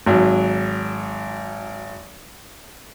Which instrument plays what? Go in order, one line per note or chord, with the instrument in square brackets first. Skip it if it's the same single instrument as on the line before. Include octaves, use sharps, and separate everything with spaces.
[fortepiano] G#1 F#3